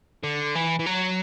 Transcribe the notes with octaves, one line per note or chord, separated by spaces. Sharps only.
D3
E3
E3
F#3